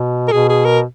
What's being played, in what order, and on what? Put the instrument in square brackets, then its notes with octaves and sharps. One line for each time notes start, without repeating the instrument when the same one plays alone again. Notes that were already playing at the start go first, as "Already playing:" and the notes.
Already playing: [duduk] B2
[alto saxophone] A#4
[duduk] B2 [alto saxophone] G#4
[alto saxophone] G#4
A#4